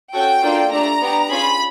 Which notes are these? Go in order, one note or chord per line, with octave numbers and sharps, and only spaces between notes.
C#4 F#4 A4 G5
A#3 D4 F4 A4
A3 D4 G4 A#5
B3 D4 G4
C#4 F4 G#4 B5